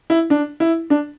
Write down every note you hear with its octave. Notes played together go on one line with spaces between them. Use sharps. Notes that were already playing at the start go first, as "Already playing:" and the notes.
E4
D4
E4
D4